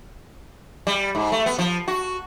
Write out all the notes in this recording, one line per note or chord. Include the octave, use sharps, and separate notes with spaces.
G3
G#2
A3
B3
F3
F#4